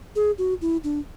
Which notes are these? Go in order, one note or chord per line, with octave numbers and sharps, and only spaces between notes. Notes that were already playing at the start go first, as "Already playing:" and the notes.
G#4
F#4
E4
D4